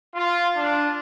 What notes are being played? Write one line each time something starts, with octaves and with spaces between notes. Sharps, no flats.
F4
D4